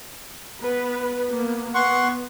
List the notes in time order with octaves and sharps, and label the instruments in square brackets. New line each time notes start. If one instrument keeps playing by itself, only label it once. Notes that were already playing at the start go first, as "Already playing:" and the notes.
[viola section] B3 B4
A#3 B3
[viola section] B3 [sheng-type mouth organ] F#5 C6 C#6